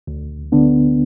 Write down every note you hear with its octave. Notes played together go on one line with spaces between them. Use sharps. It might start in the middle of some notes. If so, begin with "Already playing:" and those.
D2
D3 B3 D4